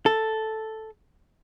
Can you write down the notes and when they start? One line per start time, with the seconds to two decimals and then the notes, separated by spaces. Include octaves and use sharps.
0.06 A4